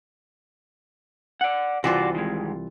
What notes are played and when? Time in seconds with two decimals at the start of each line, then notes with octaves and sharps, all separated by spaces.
1.41 D5 F#5
1.84 C2 E3 F4 F#4 C5 D5
2.15 D#3 G#3